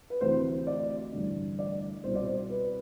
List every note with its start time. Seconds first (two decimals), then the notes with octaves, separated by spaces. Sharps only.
0.10 B4
0.21 D2 C3 E3 C5
0.67 D5
1.12 A1 G2 D3
1.59 D5
2.04 C2 B2 C5
2.15 D5
2.25 C5
2.50 B4